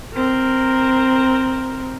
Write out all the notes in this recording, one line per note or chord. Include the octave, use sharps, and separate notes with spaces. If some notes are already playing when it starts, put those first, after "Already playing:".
C4 A#4